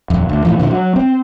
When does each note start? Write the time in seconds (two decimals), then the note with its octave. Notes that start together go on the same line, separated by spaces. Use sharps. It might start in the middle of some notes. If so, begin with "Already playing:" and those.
0.10 D#1 F2
0.29 D2
0.45 A2 E3 F3
0.59 A#2 D3 D#3 F3
0.71 F#3
0.96 C4